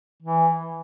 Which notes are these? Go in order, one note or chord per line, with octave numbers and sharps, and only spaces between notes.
E3